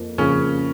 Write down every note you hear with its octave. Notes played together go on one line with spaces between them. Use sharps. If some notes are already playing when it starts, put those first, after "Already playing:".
Already playing: F2 F3 A#3
F2 C#3 F3 A#3 C#4